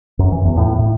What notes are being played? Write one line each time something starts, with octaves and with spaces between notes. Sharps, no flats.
F#2
E3
E2
A2
A2